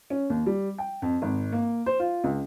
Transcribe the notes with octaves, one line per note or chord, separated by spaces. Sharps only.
C#4
D#2
G3
G5
F2
G#1
A#3
C5
F4
C#2